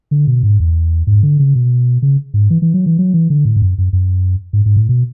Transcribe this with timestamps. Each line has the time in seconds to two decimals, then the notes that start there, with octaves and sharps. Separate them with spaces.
0.11 D3
0.27 B2
0.43 G#2
0.60 E2
1.07 G#2
1.23 D3
1.39 C#3
1.55 B2
2.02 C#3
2.34 G#2
2.50 E3
2.62 E3
2.74 F#3
2.86 E3
2.98 F#3
3.13 E3
3.30 D3
3.45 A2
3.56 G#2
3.62 F#2
3.78 F#2
3.93 F#2
4.53 G#2
4.66 G#2
4.76 A2
4.89 B2